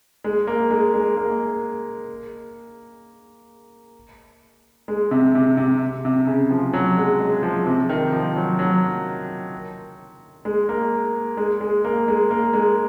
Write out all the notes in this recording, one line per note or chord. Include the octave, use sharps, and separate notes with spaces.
G#3
A#3
G#3
G#3
A#3
G#3
C3
C3
C3
C3
C#3
F3
F#3
G#3
G#3
F3
C3
D#3
F3
F#3
F#3
G#3
A#3
G#3
G#3
A#3
G#3
A#3
G#3